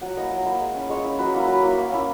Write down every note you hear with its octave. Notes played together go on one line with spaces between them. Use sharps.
F#3 F#5
A#3 E4 D#5
F#3
A#3 E4
G#3
C#4 E4
G#3 C#5
C#4 E4
F#3 B4
A#3 E4 B4
F#3 B4
A#3 E4
A#3
C#4 E4